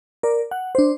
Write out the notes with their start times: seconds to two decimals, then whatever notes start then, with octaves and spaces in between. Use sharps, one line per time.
0.23 A#4 D5
0.51 F#5
0.75 D4 C5